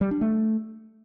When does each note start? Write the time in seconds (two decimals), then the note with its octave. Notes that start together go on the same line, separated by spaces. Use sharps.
0.01 G3
0.11 D4
0.21 A3